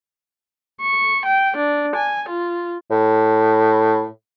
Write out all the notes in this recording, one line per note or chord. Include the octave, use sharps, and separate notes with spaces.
C#6
G5
D4
G#5
F4
A2